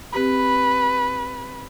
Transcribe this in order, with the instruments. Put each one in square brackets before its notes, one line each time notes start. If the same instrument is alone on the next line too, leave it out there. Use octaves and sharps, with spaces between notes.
[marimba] C4 G4 B5 [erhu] B4